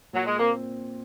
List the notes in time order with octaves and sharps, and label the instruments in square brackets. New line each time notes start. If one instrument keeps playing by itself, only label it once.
[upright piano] A#2 [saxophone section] F#3
[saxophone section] G#3
[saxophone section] A#3 [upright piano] C4